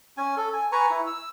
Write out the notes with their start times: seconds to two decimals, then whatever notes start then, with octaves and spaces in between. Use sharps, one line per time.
0.17 C#4 G#5
0.37 A4
0.53 G#5
0.72 B4 G#5 A#5 C#6
0.90 E4
1.07 E6